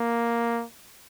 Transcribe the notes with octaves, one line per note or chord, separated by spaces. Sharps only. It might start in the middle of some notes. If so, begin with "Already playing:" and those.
Already playing: A#3